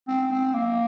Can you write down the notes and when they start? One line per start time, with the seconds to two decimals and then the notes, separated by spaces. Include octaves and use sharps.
0.08 C4
0.31 C4
0.54 A#3